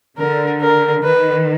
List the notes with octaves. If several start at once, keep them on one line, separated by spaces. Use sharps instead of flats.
D3 A#4
A#4
D#3 B4